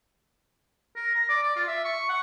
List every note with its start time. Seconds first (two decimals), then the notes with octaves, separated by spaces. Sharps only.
0.96 A#4
1.15 A#5
1.29 D5
1.43 D5
1.56 F4
1.68 E5
1.85 C#6
2.09 F#5